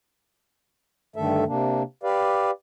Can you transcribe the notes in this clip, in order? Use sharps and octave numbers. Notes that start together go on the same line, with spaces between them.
G2 D3 D#3 A3 A4 E5
C3 A#3 D4
G4 B4 D5 F5